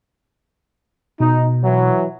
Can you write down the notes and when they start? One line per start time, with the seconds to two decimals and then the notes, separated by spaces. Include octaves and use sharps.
1.20 B2 D#4
1.64 E3 F#3